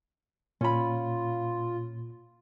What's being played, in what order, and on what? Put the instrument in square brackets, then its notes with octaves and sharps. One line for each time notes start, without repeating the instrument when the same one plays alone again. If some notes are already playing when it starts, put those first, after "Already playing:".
[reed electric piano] A#2 [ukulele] C#4 B5 [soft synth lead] F4